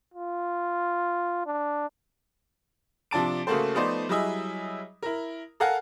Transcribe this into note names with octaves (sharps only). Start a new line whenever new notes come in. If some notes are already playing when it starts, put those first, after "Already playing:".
F4
D4
C3 F3 D4 A5 D7
C#3 A3 A#3 F#4 A4 C5
F3 A3 B3 D#4 C5 D5
F#3 G3 E4 G#4 D#5 E5
E4 A#4
A4 A#4 F5 F#5 G#5